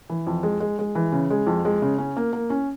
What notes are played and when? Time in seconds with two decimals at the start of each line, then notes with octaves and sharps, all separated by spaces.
0.10 E3
0.27 F2
0.43 G#3
0.60 G#3
0.79 G#3
0.95 E3
1.12 C#3
1.31 G#3
1.47 F2
1.65 G#3
1.82 C#3
1.98 C#4
2.17 A#3
2.33 A#3
2.50 C#4